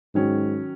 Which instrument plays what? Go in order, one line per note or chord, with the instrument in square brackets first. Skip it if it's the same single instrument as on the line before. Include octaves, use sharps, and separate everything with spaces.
[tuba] G#2 [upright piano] D#3 F#3 C#4